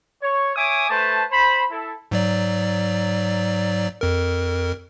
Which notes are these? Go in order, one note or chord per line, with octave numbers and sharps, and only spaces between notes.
C#5
C#5 E5 G#5 D6 D#6
A3 B4 C5 A5
C5 B5
E4 A4
G#2 F#3 D5
F2 A#4